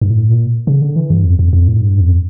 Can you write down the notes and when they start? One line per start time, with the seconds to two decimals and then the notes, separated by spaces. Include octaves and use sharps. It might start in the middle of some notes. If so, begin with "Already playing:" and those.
0.01 G2
0.10 A2
0.29 A#2
0.67 C#3
0.81 D3
0.96 E3
1.10 G2
1.24 F2
1.39 F2
1.53 F2
1.68 A2
1.81 G2
2.01 F2